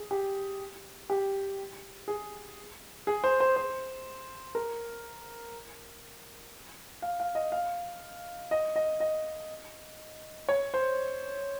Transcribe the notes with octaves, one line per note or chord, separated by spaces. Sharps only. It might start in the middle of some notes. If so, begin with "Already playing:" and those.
Already playing: G#4
G4
G4
G#4
G#4
C5
C5
C5
A#4
F5
F5
D#5
F5
D#5
D#5
D#5
C#5
C5